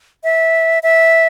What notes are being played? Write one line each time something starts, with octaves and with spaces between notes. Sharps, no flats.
E5
E5